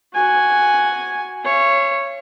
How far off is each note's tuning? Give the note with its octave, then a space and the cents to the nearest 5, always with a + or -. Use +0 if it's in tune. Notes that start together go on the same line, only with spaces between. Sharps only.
F#4 +0 G#5 +0
C#5 -5 F5 -45